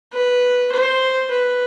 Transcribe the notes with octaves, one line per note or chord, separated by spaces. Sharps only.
B4
C5
B4